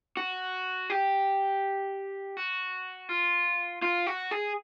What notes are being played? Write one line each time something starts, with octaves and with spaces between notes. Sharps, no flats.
F#4
G4
F#4
F4
F4
F#4
G#4